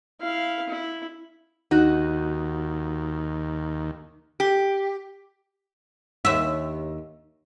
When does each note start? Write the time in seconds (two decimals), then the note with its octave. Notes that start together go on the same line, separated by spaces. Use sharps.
0.21 E4 F5
0.69 E4
1.71 D#2 D#4 F#4
4.40 G4
6.25 D#2 E5